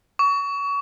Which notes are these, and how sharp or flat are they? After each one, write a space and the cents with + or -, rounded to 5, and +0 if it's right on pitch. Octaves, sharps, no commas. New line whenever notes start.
C#6 +30